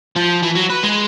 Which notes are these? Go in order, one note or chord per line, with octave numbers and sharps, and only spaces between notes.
F3
E3
F#3
B4
G#3